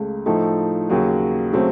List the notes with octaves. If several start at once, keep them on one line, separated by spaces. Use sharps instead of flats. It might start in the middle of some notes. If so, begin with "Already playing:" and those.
Already playing: C#2 C#3 A3
A2 F3 A3 D#4 A4
D#2 C#3 F#3
C#3 F#3 A3 C4